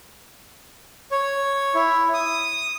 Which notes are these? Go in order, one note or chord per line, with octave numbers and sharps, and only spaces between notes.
C#5
E4
D#6